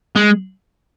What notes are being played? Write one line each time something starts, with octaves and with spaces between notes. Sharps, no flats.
G#3